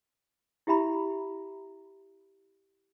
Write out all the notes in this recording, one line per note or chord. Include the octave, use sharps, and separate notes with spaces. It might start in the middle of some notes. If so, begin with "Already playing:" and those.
E4 G4 E5 A#5 B5